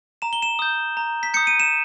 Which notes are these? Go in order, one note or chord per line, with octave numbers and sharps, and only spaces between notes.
A#5 E7
G7
E7
D#6 G6
A#5
B6
D#6 G6 C#7
D#7
E7